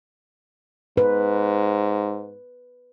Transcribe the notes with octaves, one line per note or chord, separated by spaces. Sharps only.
G#2 B4